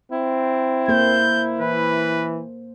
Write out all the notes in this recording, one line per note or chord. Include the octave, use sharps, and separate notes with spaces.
C4 E4
A#3 A4 C5 G6
E3 B4